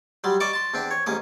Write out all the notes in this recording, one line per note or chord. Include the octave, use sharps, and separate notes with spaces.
F#3 G3 C6
D5 D#5 A5 C#6 D6
A5 C6
E2 C4 D4
C#5
A1 G#2 A#3 D#6